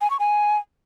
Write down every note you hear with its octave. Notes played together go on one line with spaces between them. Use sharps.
G#5
C#6
G#5